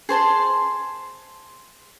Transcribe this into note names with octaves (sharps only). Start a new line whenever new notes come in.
G#4 C5 A5 C6